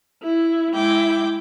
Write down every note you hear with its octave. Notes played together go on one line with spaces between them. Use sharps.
E4
G#3 E4 G5 D6